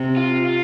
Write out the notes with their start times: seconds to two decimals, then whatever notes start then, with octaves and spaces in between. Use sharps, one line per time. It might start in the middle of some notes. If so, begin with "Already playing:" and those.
Already playing: C3
0.17 F4
0.46 F4